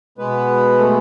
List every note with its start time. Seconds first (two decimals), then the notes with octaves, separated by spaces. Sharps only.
0.18 B2 G#3 B3 B4
0.79 A3 A4